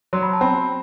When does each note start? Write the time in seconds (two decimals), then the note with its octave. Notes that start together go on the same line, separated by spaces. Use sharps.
0.13 F#3 C6
0.23 B5
0.33 A5
0.41 C4 B5